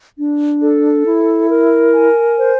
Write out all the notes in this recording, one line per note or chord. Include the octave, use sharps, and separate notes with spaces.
D4
A4
E4
A#4
G#5
C5